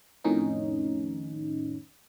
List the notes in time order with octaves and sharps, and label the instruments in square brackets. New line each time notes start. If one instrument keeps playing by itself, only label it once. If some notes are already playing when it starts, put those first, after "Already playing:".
[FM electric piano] F2 A2 D#3 C#4 D#4